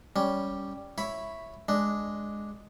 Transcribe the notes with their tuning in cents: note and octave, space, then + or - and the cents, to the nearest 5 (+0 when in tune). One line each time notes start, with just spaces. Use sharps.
G3 +0 C#4 +10
E4 +0 C#5 -5 B5 +0
G#3 +0 D4 +0